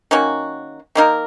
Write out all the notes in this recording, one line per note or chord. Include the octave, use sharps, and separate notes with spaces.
D#3 A#3 C#4 F#4
D#3 A#3 D#4 A#4